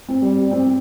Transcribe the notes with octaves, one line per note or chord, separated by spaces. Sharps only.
C4
G3
C4